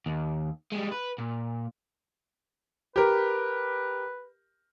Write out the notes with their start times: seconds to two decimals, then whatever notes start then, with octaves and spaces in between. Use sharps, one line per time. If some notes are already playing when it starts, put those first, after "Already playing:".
0.06 D#2
0.72 G3 G#3
0.91 B4
1.18 A#2
2.96 G4 A#4 B4